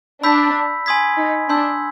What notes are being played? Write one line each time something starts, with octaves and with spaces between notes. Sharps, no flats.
D4 B5 E6 G6 B6
G#5 C6 D#6 G#6 B6
D#4
D4 C6 E6 G6